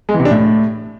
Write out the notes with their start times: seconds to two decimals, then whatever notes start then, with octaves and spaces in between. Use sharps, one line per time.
0.09 G#3
0.14 E3
0.20 C3
0.25 D4
0.31 A2